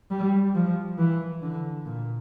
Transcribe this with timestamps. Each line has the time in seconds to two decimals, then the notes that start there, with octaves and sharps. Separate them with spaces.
0.11 G3
0.55 F3
0.98 E3
1.42 D3
1.86 A#2